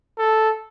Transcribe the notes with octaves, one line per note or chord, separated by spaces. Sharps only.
A4